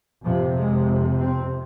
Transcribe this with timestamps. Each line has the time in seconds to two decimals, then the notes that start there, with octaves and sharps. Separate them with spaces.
0.24 F2 C3 F3
0.57 G#3
1.20 C4